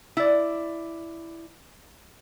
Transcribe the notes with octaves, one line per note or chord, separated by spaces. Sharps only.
E4 D5